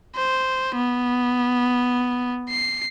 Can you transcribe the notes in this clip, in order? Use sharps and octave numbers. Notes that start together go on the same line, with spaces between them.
C5
B3
C7